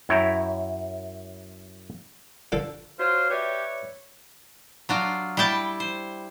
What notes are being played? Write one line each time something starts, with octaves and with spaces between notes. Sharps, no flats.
F#2 E4 C#5 E5 G5 A#5
D3 F3 A4
F4 F#4 C5 C#5
G4 B4 C#5 D5 E5
F#3 D4 F4
G3 E4 G5 A5
C5